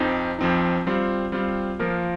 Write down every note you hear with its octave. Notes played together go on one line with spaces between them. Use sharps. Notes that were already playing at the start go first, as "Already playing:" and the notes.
Already playing: F2 F3 C4 D#4
F2 F3 C4 D#4
G3 C4 F4
G3 C4 F4
F3 A#3 F4 A#4